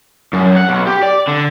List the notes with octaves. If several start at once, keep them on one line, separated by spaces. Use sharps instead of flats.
F#2
F#5
B1
G4
D5
D3